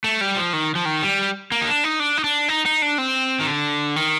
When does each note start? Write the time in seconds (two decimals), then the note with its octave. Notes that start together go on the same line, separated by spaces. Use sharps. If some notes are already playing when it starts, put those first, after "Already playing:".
0.04 A3
0.21 G3
0.36 F3
0.53 D#3
0.75 F3
0.85 D#3
1.03 G3
1.52 A#3
1.61 D#4
1.68 D4
1.84 D#4
2.00 D4
2.18 D#4
2.24 D4
2.48 D#4
2.66 D#4
2.82 D4
2.98 C4
3.40 D#3
3.47 D3
3.96 D#3